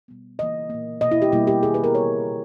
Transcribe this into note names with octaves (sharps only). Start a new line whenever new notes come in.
B2 G3 B3
C#3 E3 A#3 D#5
A#2 A#3
B2 A#3 D#5
E4
G4
B2 G3 A#3 E4
G4
D#3 G3 B3 G#4
B4
A#4
C#3 E3 G3 C#5
A#2 G3